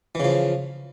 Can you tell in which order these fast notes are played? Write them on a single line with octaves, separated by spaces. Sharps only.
E3 C#3 F3